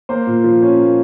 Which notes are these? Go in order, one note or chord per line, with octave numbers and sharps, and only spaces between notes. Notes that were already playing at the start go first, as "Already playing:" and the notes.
A#3 C5
A#2
F3
C#4
A#3